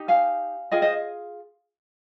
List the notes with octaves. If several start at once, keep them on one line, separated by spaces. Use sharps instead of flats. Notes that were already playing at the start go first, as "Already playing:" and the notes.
Already playing: D#4 G4
F5 G#5
F4 G#4 D#5 G5
C5 D#5